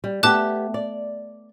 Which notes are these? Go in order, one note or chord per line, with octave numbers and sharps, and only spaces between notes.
G3
A3 B3 G4 A5 D6 F#6
D5